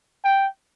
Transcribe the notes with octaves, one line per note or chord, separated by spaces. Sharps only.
G5